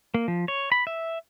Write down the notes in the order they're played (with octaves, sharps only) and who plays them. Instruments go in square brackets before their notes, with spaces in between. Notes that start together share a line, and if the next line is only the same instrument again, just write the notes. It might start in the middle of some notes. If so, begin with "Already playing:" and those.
[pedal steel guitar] A#3
F3
C#5
B5
E5